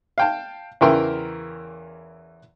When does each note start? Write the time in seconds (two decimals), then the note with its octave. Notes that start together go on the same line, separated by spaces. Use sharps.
0.18 F5 G5 A5
0.81 E2 C#3 E3 A#4 G5 C6